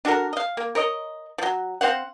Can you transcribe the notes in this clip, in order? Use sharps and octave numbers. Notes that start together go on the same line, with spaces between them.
D4 F#4 A4 A#4
D#5 F5
A#3
A#4 C#5 D#5
F3 F#3
C4 C5 F5 F#5